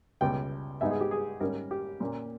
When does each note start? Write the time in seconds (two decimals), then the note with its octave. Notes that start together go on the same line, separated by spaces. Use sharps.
0.21 C#2 B2 G3 G5
0.81 G#2 G3 B3 D#4 E5
0.91 G#4
1.01 G4
1.11 G#4
1.41 G#2 G3 C#4 A#4
1.71 G4
2.00 A#2 A#3 C#4